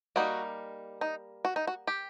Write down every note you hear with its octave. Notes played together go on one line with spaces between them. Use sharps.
G3 A#3 D#4 F#4
D#4
F#4
D#4
F#4
G4